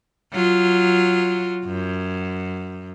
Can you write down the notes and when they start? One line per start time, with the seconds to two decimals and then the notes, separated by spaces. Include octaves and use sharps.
0.32 F#3 F4
1.65 F#2